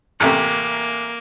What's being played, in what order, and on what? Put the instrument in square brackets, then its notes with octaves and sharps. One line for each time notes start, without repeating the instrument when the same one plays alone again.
[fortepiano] A1 C3 A3 [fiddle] A#3